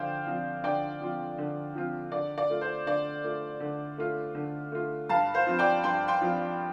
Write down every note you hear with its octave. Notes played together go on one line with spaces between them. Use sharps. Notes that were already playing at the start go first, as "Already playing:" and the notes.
Already playing: D3 F3 F4 C5 D5 F5 G5
F3 C4 F4
D3 D5 G5
F3 C4 F4
D3
F3 C4 F4
D3 D5
D5
A3 F4
C5
D3 D5
A3 F4
D3
A3 F4
D3
A3 F4
G2 F5 A5
C5 F5
F3 C4 F4
D5 G5
G2 G5 C6
G5 C6
F3 C4 F4